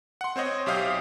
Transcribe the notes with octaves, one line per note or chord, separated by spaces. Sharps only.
F#5 C6
C4 C5 C#5 D#5
B1 G4 E5 F5 D#6 G6